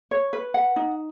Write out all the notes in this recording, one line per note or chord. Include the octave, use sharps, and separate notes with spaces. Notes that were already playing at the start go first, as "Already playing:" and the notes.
C#5
B4
F#5
D#4